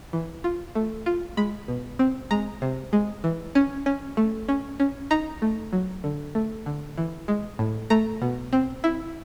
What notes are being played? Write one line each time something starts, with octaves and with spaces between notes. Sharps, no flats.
E3
F4
A3
F4
G#3 B5
B2
C4
G#3 A#5
C3
G#3
E3
C#4
C#4
A3
C#4
C#4
D#4 A#5
A3
F#3
D3
A3
D3
E3
G#3
A2
A3 A#5
B2
C4
E4